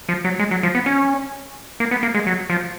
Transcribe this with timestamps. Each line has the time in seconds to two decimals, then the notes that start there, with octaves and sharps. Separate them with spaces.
0.09 F3
0.24 F#3
0.39 G#3
0.51 F#3
0.63 F3
0.75 B3
0.86 C#4
1.80 A#3
1.91 B3
2.03 A#3
2.15 G#3
2.27 F#3
2.50 F3